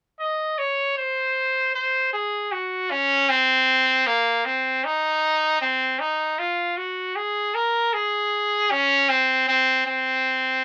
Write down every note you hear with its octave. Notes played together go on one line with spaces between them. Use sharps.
D#5
C#5
C5
C5
G#4
F#4
C#4
C4
A#3
C4
D#4
C4
D#4
F4
F#4
G#4
A#4
G#4
C#4
C4
C4
C4